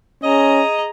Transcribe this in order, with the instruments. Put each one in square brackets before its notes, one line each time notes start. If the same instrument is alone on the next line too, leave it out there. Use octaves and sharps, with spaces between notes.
[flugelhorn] C#4 [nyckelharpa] G#4 A#5 [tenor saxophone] D#5